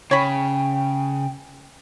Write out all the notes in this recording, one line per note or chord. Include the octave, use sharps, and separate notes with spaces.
C#3 C#5 G5 B5